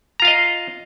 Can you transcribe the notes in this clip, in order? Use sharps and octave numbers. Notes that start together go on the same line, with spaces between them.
F4 D#5 F5 A#5